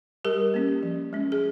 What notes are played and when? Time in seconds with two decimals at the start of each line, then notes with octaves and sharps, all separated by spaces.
0.25 G3 G4 A#4
0.54 A#3 C#4
0.83 F3
1.13 G#3 C#4
1.32 G#4